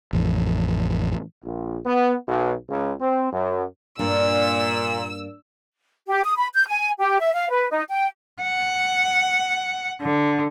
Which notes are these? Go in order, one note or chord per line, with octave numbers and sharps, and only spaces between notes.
A1 F2
A#1
B3
B1
C#2
C4
F#2
G2 A#2 A#3 D4 E6
G4
D#6
B5
G6
G#5
G4
E5
F5
B4
D#4
G5
F#5
D3